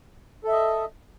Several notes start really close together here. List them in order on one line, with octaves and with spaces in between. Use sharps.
A4 E5 D#5